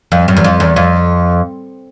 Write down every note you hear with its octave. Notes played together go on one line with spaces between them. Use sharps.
F2
F#2
E2
F2
E2
F2